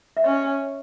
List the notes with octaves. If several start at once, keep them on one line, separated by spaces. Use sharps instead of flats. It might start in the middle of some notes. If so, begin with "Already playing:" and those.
E5
C#4 D#5